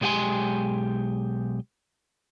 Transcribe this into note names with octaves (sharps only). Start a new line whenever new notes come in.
B1 G#3 G4 F#5 G#5 C6